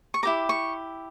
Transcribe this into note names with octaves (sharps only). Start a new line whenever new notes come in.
C#6
E4 G4 A#4 D6
C#6